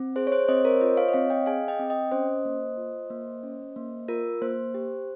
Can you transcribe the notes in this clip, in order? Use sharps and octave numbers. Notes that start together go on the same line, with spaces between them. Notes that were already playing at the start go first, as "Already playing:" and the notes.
Already playing: C4
G#4 C5
C#5
C5
C4 C5 D#5
A#4 C#5
F4 C5 D#5
C#5 F5
D#5
C4 C#5 F5
D#5 G5
G#4 F5 G#5
D#5 G5
C4
D#5 G5
C#4 C5 D#5
A#3
F4
A#3
C#4
A#3
F4 A#4
A#3 C5
G4